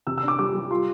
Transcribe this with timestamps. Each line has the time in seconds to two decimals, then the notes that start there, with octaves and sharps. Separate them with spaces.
0.07 C3 E6
0.18 E6
0.23 D4
0.28 D6
0.39 G3 D6
0.54 G3
0.70 F4 C6